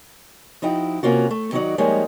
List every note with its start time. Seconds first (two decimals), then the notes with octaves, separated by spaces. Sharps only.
0.62 F3 D#4 E4 F#4 G5
1.03 C3 A#3 C#4 F4 F#4
1.31 A3
1.52 D#3 F#3 D#4 F4 F#4 D5
1.78 F3 G3 G#3 A#3 D#4 C#5